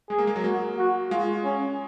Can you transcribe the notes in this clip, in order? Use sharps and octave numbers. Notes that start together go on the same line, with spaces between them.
G#3 G#4
A#3
G#3
F#3
A#3 F#4
F#4
G#3 F4
C#4